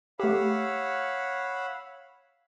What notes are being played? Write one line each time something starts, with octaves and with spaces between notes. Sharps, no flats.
A3 G4 C#5 F5 F#5 B5 E6